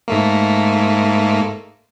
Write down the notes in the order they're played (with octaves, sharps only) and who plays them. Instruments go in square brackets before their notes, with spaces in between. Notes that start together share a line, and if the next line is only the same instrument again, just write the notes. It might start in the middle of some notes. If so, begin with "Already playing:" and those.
[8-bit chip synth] G#2 A3 A#3